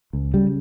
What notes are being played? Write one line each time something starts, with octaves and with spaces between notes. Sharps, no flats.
C#2
C#3 G3